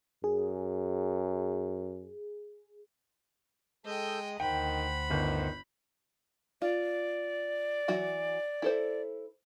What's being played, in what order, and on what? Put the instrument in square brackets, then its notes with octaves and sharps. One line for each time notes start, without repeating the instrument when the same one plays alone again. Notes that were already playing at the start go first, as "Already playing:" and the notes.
[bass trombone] F#2 [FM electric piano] G#4
[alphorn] G#3 [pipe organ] A4 E6 G6 [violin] D#5 G5
[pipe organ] D2 C5 F#5 [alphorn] D#3 [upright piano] G5 [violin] B5
[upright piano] G1 [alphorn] D#3
[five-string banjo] F4 [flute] D5
[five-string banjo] E3 F#3 F#4
E4 A4 C5